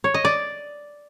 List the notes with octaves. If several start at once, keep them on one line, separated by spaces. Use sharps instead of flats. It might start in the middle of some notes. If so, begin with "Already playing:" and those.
C#5
D#5
D5